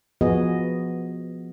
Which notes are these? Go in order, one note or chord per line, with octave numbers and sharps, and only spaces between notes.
F3 B3 F#4 G#4 D#5